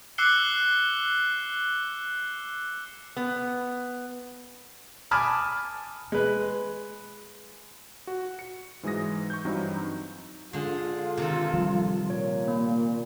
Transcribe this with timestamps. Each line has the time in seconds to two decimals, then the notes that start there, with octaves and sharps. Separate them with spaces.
0.18 D6 E6 F#6 C7 C#7 G7
3.17 B3
5.11 G#5 A5 B5 D6 D#6 F6
6.12 G#3 B4
8.07 F#4
8.39 C#7
8.83 G#2 E3 F#3 G#3 D#6 A#6
9.30 C#6 G6
9.45 G2 E3 F#3 C4 D#4
10.53 D3 G#3 F4
11.17 C3 D#3 A4
11.54 F3 G3
12.10 A#2 C#5
12.48 A#3